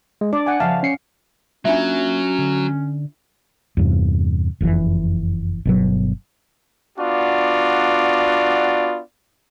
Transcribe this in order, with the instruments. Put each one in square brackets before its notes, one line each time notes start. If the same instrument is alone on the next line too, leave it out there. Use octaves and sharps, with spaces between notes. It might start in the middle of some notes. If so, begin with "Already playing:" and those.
[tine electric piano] G#3
[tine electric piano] D4 [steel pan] D5
[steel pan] F#5 G#5
[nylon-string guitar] C#3 F3 E5 [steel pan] F5 [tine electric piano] A5
[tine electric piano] C#4 C7 C#7
[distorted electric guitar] F#3 [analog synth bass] A#3 [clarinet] C#4 [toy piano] D4 F4 E5
[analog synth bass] D3
[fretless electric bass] E2 G2 C3
F#1 F2 G#2 E3
G1 B2 F#3
[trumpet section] B3 D4 F4 F#4 D5